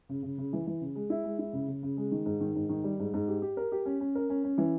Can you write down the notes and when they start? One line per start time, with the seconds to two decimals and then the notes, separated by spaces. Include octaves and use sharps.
0.09 C#3
0.23 C#3
0.38 C#3
0.53 E3
0.67 E3
0.81 C#3
0.95 G#3
1.10 E4
1.24 G#3
1.39 E4
1.53 C#3
1.68 C#3
1.83 C#3
1.97 G#3
2.11 D#3
2.26 G#2
2.41 D#3
2.55 G#2
2.69 D#3
2.84 G3
2.99 G#2
3.14 G#2
3.28 G4
3.42 G4
3.57 A#4
3.72 G4
3.86 C#4
4.00 C#4
4.15 A#4
4.30 C#4
4.44 C#4
4.58 E3